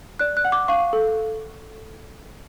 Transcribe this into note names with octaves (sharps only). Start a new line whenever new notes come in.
D5 F#6
F#6
F#5
D6
F5 C#6
A4